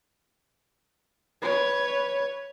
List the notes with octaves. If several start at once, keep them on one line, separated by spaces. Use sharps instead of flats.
B4 C#5